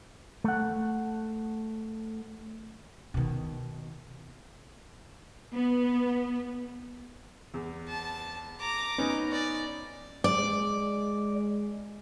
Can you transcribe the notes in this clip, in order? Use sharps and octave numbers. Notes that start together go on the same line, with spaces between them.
A3 F#5
B2 D#3
B3
E2
A5
A#5 D6
B3 C#4 D#4
D5
G#3 D5